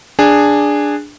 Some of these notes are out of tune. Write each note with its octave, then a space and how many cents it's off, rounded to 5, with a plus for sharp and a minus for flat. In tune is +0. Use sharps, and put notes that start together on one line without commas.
D4 +0 G#4 -10